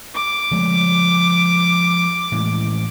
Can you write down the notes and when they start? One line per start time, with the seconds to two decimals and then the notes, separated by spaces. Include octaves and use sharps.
0.15 D6
0.51 F3 G#3 A3
2.32 A2 E3 G#3